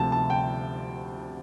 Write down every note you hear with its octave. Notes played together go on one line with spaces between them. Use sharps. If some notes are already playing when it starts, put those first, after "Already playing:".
Already playing: D2 C3 F3 A5
A5
G5